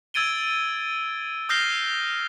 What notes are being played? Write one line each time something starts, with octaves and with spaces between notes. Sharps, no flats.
E6 G#6 A6 D7 D#7 G7
D#6 F6 G6 A#6 C7 G7